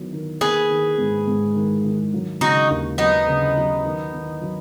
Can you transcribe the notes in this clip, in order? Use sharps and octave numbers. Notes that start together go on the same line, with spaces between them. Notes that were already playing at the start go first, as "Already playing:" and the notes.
Already playing: D#3 F#3 B3
D#3
A#3 G#4 B4
D#3
G#2
G#2
D#3
D#3
F#3
C#3 D#4 F#4
D#2
F#3 B3 D#4
C#3
F#3
D#3
D#3
F#3